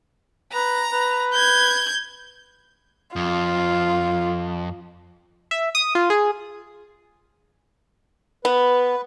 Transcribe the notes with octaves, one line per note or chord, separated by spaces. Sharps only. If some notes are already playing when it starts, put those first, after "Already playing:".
B4 A#5
B4
G6 G#6
F2 F4
E5
D#6
F4
G#4
B3 B4